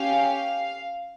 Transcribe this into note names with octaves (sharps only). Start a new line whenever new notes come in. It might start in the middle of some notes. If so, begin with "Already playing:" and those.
Already playing: C#4 G4 F5